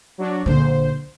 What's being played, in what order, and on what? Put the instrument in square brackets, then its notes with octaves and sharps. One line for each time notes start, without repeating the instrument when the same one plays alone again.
[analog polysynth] F#3 D4 F#4
[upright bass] A#1 D3 [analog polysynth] C5